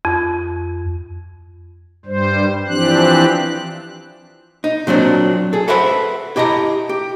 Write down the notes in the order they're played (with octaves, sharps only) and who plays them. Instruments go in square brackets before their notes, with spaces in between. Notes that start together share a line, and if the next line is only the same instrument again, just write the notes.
[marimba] F2
[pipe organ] G2 G3 C5
E3 F3 C4 D4 G4 F#6
[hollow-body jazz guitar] D#4
A#2 F#3 C4 D4
G#4 A4
A4 B4 C5 E5 F#5 B5
E4 G4 D#5 A5 A#5
G4